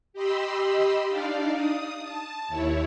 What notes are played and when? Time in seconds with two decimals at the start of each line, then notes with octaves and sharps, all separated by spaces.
0.13 G4 D#5 B5 C6 E6
1.09 D4 D#4 D5 F5
1.53 D#6
2.02 A5
2.48 D#2 E4 C#5